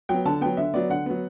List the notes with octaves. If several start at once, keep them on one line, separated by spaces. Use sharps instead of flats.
F#3 B3 G5
D3 A5
F#3 B3 G5
D3 E5
F#3 B3 D5
D3 F#5
F#3 B3